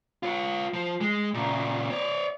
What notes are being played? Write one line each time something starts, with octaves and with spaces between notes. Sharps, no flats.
F4 C#5
F3
G#3
A#2 C#3
C#5 D5